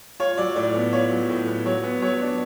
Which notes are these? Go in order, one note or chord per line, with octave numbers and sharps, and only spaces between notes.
F4 C#5
F#3 D5
A2 D5
B3
F4 C#5
F#3
A2
B3
F#3 C#5
B3
F#3 C#5
D4